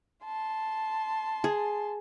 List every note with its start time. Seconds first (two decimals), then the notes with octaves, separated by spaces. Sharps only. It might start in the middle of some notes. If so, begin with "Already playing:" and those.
0.25 A5 C6
1.44 G#4